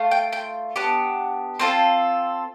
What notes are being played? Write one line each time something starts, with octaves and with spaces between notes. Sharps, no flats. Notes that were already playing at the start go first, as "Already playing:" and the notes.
Already playing: A3 F4
G5
G5
B3 D4 G4
C4 F4 A4